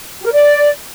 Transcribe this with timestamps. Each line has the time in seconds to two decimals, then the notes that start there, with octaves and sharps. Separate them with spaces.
0.20 G4
0.25 A#4
0.31 D5